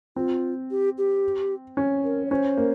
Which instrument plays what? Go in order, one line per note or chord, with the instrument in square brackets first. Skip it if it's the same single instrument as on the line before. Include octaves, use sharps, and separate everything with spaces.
[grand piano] C4 [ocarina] F4
[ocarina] G4
G4
[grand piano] C#4
[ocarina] A#4
C#5
[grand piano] C#4 [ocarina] C5
[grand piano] A#3